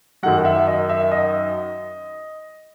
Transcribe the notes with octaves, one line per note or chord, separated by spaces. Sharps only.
F#2 D#3 F#3 F#5
F#5
E5
D#5
E5
D#5